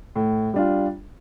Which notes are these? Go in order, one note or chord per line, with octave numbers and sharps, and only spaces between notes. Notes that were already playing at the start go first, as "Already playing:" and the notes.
A2
G3 D4 F4